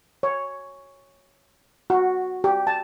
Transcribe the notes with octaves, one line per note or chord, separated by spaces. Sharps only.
C#5
F#4
G4
A5